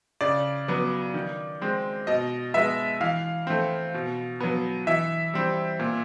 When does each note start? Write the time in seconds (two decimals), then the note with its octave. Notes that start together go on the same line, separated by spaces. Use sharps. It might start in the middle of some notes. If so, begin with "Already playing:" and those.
0.21 C#3 D5
0.68 F#3 B3
1.14 D#3
1.62 G#3 C4
2.07 B2 D#5
2.54 G#3 B3 E5
3.01 E3 F5
3.47 A3 C4
3.94 B2
4.40 F#3 B3
4.87 E3 E5
5.34 G3 C4
5.80 A#2